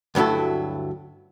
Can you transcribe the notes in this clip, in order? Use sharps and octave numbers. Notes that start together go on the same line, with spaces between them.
D2 G2 F#3 E4 A4